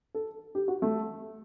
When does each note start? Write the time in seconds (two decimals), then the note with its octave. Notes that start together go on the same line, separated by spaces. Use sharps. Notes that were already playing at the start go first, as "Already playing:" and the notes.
0.14 A4
0.55 G4
0.68 F#4
0.82 A3